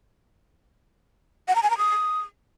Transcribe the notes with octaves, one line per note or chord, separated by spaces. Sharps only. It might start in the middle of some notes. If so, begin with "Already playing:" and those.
F#5
A#5
G#5
A#5
D#6